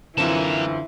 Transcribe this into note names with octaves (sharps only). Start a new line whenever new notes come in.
F#2 D3 E3 A#3 C4 F4 A5